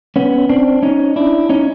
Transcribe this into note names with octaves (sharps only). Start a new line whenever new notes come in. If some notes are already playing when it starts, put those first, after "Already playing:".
B3 C#4
C4 D4
C#4 D#4
D4 E4
C#4 D#4